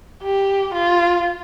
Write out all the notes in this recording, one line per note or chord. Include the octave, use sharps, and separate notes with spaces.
G4
F4